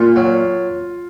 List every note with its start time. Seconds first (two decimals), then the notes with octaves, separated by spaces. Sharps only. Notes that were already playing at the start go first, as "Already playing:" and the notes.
Already playing: A#2 F4
0.16 F#3